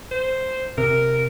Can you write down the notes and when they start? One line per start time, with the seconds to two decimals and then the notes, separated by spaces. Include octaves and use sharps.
0.11 C5
0.78 C3 A#4